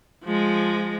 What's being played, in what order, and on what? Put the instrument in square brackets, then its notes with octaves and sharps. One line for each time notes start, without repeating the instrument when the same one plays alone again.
[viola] F3 G#3